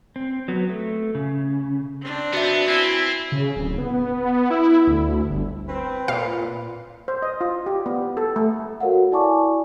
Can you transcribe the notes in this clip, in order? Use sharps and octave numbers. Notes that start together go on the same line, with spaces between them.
C4
F#3 B3
A3
C#3
C4 D4
B3 F#4 E5
C4 E4 G#5
C#3
D1
B3
E4
D2
G1
C4 B4
A#2 F5
C5
D#5
F4
G4
B3
A4
A3
F#4 A4 A#4 C#5 F5 F#5
E4 D5 G#5 A5 C#6 D6